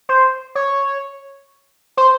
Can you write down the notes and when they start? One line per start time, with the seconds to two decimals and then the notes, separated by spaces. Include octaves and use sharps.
0.09 C5
0.55 C#5
1.97 C5